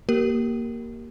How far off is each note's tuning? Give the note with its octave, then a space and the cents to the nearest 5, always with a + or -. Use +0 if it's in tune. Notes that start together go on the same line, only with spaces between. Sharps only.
A#3 +0 G4 -20 A#4 +0